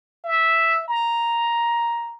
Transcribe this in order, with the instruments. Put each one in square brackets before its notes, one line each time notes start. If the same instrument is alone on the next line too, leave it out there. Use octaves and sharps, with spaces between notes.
[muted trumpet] E5
A#5